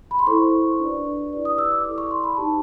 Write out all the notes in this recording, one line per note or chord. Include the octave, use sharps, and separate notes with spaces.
B5
C6
E4 A4 C5 C#6
D4 F#4 B4 D5
E4 G4 B4 D5
D#6
E6
D6
E4 A4 D5 D6
C#6
C6
B5
D#4 G4 C5 A5